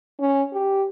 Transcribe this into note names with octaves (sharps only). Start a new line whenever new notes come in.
C#4
G4